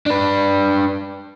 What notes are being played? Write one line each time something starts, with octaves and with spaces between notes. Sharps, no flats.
D4 B4